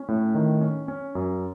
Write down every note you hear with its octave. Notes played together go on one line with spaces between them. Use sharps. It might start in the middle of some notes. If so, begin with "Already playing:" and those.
Already playing: C#4
A2
D#3
C#4
C#4
F#2